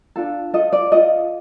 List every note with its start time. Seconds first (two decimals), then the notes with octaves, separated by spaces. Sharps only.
0.16 D4 F4 A4
0.53 F4 A4 D#5
0.73 D5
0.92 F4 A4 D#5